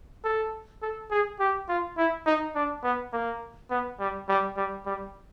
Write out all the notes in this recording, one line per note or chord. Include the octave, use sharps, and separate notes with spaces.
A4
A4
G#4
G4
F4
E4
D#4
D4
B3
A#3
B3
G3
G3
G3
G3